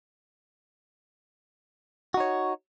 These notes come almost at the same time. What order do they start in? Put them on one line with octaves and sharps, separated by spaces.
F#4 D#4 C#5